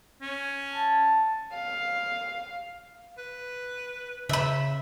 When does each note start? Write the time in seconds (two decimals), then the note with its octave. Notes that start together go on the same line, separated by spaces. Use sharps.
0.22 C#4
0.74 A5
1.54 F5
3.18 B4
4.29 C#3 E5 B5